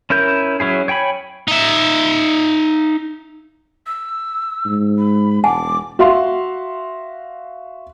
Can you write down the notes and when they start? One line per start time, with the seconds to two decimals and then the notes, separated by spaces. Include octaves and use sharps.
0.10 C#4 E4 A#4 G6
0.60 F#3 C#4 E4 G#4
0.88 C#5 G5 G#5 B5
1.48 D#4 E5
3.86 E6
4.66 G#2
4.98 B5
5.44 E1 F#5 G#5 A5 D6
5.99 F#4 E5 F5 C6